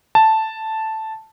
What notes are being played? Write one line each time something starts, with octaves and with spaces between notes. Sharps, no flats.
A5